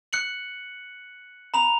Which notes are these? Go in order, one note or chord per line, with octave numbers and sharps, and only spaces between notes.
F#6 C#7 F#7
A#5 B5 F7